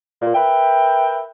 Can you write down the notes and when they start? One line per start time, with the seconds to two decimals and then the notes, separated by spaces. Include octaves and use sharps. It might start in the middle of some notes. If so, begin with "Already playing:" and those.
0.22 A#2
0.35 A#4 B4 E5 G5